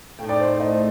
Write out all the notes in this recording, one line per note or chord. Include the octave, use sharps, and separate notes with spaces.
A2 A3 D#4 G5
D5
C5
D#5
C5